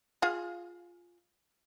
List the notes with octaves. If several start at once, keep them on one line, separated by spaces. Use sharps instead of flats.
F4 G#4 F5